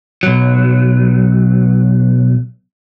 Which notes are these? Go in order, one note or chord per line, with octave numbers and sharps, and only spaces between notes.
B1 F#3